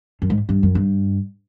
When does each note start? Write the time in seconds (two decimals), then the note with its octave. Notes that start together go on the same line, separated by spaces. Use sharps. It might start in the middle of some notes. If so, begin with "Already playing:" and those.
0.22 F#2
0.30 G#2
0.49 G2
0.63 F#2
0.75 G2